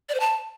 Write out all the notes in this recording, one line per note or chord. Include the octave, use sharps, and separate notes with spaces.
D5
C5
A5